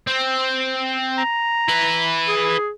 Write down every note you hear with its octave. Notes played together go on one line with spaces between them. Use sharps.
C4
A#5
E4 B4
G#4